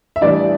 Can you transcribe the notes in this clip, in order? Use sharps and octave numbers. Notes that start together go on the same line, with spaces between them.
E5
A1 A2 E3 G3 D4 D5